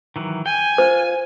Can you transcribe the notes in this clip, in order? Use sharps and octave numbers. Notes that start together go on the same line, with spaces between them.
D#3 E3 F#3
G5 G#5
F4 C5